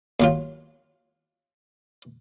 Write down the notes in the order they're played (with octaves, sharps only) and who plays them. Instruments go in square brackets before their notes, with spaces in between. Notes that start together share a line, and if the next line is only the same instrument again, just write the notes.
[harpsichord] D#2 F#3 F4